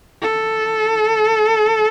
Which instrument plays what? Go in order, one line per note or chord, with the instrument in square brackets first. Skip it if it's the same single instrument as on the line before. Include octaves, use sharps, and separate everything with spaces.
[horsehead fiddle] A4